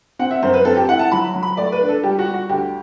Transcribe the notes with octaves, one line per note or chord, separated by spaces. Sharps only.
C4 F#5
E5
F#2 C5
B4
C4 A4
G4
E4 F#5
A5
F#3 B5
F#3
B5
A3 D5
B4
D4
A4
G3 G4
F#4
G3
F#4
D2 G4